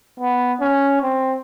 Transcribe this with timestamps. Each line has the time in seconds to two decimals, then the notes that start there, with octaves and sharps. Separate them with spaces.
0.20 B3
0.61 C#4
1.02 C4